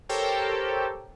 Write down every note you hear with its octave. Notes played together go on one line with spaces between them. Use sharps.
G4 A4 A#4 C5 C#5 G5